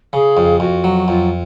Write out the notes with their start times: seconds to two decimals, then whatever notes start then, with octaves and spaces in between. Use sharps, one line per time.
0.13 C#3 G#4
0.37 F2
0.60 F2 F#4
0.84 F#3
1.08 F2 F4